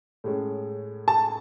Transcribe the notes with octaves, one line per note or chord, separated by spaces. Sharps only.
A2 G#3 C#4
A5